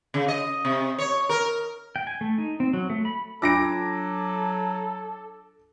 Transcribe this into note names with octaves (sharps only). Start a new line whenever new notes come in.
C#3
D#5
C3
C#5
A#4
G5
G#5
A3
D#4
C4
F#3
A3
B5
F#3 D4 F4 A4 D6 E6 A#6 D7